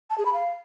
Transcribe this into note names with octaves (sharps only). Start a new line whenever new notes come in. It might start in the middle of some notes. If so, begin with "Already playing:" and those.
A5
G#4
B5
F5